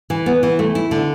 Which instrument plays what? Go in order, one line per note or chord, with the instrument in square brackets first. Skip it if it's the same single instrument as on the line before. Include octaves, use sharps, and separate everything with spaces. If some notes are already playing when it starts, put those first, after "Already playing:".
[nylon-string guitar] E3
B3
E3
A3
E4
D3